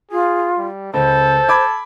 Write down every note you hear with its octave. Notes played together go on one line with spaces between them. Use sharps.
F4 G#4
G3
C#2 A4 C5
B5 D6 G#6